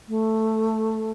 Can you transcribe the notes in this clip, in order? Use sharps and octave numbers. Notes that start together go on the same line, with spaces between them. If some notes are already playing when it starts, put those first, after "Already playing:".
A3